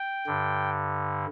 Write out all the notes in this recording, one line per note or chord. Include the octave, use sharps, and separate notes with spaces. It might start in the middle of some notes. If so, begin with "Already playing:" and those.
Already playing: G5
G2 D3